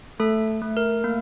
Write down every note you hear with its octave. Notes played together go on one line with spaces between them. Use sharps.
A3 A4
A3
A#4
A#3